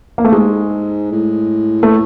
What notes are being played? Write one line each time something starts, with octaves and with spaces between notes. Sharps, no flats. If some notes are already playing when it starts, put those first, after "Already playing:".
A#3
A3
G#2 G#3
A2
A3